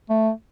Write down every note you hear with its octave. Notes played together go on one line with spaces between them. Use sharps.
A3